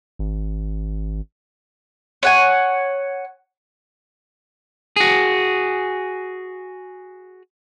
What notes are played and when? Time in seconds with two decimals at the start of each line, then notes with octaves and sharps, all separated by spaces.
0.19 G#1
2.23 C#5 F#5 G#5
4.96 F#4 G#4